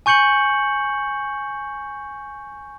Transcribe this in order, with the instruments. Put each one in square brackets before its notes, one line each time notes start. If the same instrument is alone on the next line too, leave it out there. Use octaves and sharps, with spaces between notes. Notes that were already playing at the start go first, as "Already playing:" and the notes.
[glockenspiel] G#5 C#6 G6 C#7 F#7